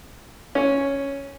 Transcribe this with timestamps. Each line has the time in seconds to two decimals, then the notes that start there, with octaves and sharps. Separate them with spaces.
0.55 C#4